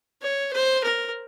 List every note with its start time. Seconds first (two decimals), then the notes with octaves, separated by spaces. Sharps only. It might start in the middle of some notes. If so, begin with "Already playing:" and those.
0.22 C#5
0.53 C5
0.84 A#4